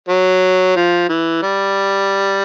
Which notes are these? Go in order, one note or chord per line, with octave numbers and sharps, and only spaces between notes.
F#3
F3
E3
G3